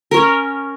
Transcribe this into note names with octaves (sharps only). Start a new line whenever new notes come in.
C#4 A#4 C#5